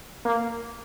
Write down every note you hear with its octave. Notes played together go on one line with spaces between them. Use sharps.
A#3